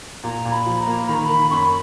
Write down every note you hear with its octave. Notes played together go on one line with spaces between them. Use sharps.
A#2 A#5
A#2
B5
F3
A#5
A#3
D#3 B5
A#5
B5
D#3
F#2 B5 C#6